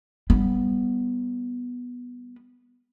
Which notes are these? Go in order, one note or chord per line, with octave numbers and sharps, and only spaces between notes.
G3 B3